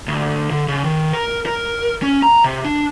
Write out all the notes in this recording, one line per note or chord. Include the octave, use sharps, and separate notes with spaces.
D2
D3
C#3
D#3
A#4
A#4
C#4
A#5
C3
D4